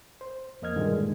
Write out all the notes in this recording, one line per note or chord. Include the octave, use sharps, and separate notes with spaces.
C5
F2 A#3 D#5 F6 G#6
G2 A#2 D3 D#3 G#3